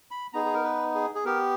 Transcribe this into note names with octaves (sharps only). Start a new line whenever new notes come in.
B5
B3 D#4 G#4 A#5
G#4
A#4
B4
G#4
G#4
B3 G4 A#4